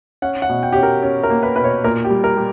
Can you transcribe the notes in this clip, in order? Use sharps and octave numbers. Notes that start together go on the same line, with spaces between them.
C#4 F#5
F#5
B2
G5
C#4 G4
A#4
C#4
A#4
A#3
B4
B2 B4
C#5
A#2 A#4
G4
G3
A#4
G3